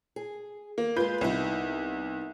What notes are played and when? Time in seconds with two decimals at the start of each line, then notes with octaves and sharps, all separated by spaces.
0.16 G#4
0.78 A#3
0.96 G#3 F4 B4 G6
1.21 C2 B3 D#4 E4